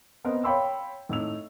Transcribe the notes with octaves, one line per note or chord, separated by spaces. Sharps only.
B3 A#4 C5 D#5 A#5
C#5 F5 G5 B5 C6 E6
A2 D#4 E6 F7